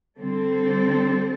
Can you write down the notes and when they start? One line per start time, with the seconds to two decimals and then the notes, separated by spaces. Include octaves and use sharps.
0.18 D3 G3 C4 A4 C5